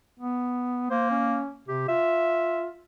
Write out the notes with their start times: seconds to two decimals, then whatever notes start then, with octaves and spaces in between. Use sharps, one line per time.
0.20 B3
0.90 A#3 C5
1.10 C#4
1.68 C3 G4
1.88 F4 E5